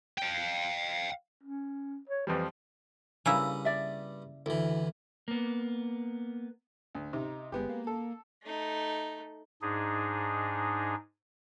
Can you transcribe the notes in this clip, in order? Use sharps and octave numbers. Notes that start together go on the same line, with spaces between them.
F5 G5
C#4
C#5
F2 E3 F3 G3
G2 C#3 A#3 E4 D#6
D5 E5
D2 E3 E4
A#3 B3
D2
C3 D#4
G1 G#3 B3 G4
A#3
A4
A3 D#4
G#2 D4 D#4 G#4